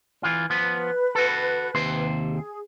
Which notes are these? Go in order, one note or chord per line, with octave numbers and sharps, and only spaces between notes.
E3 F4
F3 B3 B4
F#4 A4
D#2 C3 C5
G#4